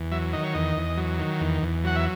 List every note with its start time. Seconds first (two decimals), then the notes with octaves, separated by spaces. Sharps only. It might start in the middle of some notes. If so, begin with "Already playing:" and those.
Already playing: E2
0.11 F#3 E5
0.33 D#3 D#5
0.44 C#5
0.54 E2 D#5
0.77 E2
0.97 F#3
1.19 D#3
1.40 E2
1.63 E2
1.84 F#3 F#5
1.96 E5